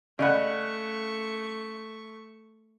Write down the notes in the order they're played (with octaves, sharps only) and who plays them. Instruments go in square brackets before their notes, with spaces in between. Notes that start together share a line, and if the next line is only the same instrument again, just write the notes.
[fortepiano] C#3 F#5 [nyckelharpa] A3 C#6 [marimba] D5 D#5 B5